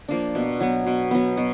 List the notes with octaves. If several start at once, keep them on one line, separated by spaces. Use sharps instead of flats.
F3 A#3 D4
B2
F#3 B3
B2
F#3 B3
B2